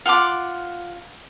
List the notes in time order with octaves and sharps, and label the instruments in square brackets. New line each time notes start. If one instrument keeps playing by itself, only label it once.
[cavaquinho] F4 F#5 C6 D6